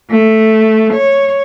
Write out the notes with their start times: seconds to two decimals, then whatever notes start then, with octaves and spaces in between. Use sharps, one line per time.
0.10 A3
0.93 C#5